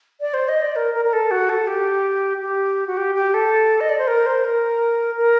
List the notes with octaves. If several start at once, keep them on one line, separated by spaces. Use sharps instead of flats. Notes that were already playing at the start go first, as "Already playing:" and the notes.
D5
C5
D#5
D5
A#4
A#4
A#4
A4
F#4
A4
G4
G4
F#4
G4
G4
A4
D#5
D5
C5
A#4
C5
A#4
A#4